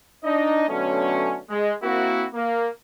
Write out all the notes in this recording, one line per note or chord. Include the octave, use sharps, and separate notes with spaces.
D4 D#4 D#5
B2 D3 F#3 A3 C#4
G#3
A#3 C4 E4 F#4
A#3